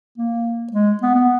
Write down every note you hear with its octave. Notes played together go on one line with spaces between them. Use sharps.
A#3
G#3
B3
B3